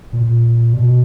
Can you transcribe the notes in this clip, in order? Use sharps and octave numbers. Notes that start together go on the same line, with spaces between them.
A#2
B2